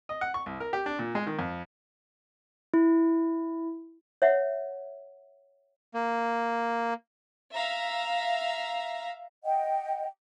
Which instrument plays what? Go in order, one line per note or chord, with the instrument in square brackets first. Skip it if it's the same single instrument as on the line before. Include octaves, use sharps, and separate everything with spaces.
[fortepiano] D#5
F#5
C#6
C2
A#4
G4
D4
A#2
G#3
D#3
F2
[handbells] E4
[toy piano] C#5 E5 F#5
[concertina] A#3
[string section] E5 F5 A#5
[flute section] D#5 F#5 G5